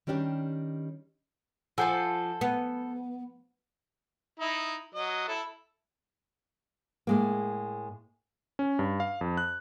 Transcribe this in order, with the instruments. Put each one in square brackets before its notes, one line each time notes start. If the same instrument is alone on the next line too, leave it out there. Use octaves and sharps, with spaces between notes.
[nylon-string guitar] D#3 G3 C#4 D4 G4
[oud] F3 [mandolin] A4 C5 A5 [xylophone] F#5 G#5 E6
[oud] B3
[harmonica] D#4 E4
F#3 D#5
E4 A4
[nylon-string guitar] A2 G#3 A#3
[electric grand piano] C#4
G2
F5
F2
F#6